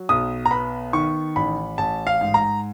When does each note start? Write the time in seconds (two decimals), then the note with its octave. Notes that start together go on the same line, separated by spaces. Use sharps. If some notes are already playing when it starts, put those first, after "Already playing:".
Already playing: F#3
0.09 B1 D#6
0.46 A#5
0.51 B3 B5
0.93 D#3 C#6
1.36 A1 B5
1.78 A1 A5
2.07 F5
2.21 G#2
2.34 A#5